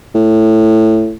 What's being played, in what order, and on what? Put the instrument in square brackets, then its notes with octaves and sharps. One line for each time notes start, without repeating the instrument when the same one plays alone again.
[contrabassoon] A2